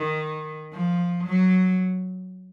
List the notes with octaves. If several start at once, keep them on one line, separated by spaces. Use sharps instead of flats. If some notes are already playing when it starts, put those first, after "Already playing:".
Already playing: D#3
F3
F#3